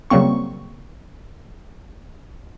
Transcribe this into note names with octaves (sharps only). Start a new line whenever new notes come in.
C#3 F#3 G3 A#3 C4 C#6